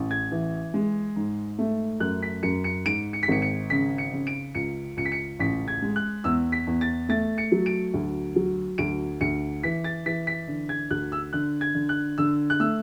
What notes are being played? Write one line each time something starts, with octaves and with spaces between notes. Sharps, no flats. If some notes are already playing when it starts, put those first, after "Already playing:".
Already playing: A1
G#6
E3
G#3
G#2
A3
F#2 F#6
B6
F#2 C#7
C#7
G#2 D7
C#7
B6
G#1 C#7
C#7
C#3 B6
C#7
C#3
D7
C#2 C#7
C#2 C#7
B6
C#7
A1 B6
G#6
G#3
F#6
E2 E6
B6
E2
A6
A3 A6
C#7
F#3
D7
D2
F#3
D2 D7
D2 C#7
E3 B6
A6
E3 B6
B6
D3
G#6
D2 F#6
E6
D3 F#6
G#6
D3
F#6
D3 E6
F#6
A3 E6